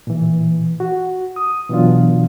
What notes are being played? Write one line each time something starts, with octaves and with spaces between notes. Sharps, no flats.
A#2 E3
F#4
D#6
B2 E3 F#3 B3 D4 F4